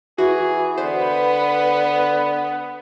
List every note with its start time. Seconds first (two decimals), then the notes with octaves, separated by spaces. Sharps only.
0.18 E3 F#4 G#4
0.78 D3 B3 B4 C5